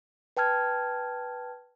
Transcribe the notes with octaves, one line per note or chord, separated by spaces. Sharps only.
B4 G5 A5 F6 G#6